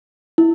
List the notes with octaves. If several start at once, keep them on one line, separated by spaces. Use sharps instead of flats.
E4